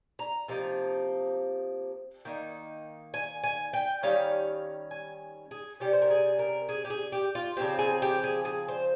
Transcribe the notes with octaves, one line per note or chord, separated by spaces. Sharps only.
A#5
C3 F3 A#3 D#4
D#3 A#3 D#4
G#5
G#5
G5
D#3 G3 C#4 F5
G#5
G#4
C3 G3 C#4 G4
C5
A#4
G#4
A#4
G#4
G4
G#4
G4
F4
C#3 F3 C4 G4
G#4
G4
G#4
G#4
C5